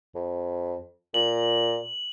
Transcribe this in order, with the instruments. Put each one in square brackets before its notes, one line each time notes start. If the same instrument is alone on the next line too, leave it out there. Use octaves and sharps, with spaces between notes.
[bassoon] F2
[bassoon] A#2 [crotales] F#7